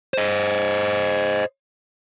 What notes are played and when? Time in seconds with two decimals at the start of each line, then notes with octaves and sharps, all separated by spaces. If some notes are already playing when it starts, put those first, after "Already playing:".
0.14 C5 D#5